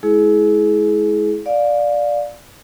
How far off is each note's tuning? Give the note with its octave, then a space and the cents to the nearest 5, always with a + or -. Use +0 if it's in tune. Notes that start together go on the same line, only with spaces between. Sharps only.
G#3 +35 E4 -15 G#4 +25
D5 +0 F5 +20